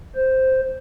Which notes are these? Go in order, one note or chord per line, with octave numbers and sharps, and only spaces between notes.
C5